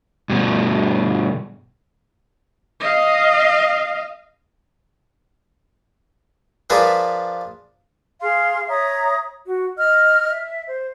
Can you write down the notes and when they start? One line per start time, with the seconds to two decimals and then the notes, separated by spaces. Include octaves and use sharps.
0.30 G2 B2
2.80 D#5 F5
6.70 F3 D4 G#4 A#4 B4 E5
8.21 G#4 F5 C6
8.69 C#5 E5 A#5 D#6
9.45 F#4
9.77 D#5 F6
10.31 E5
10.67 C5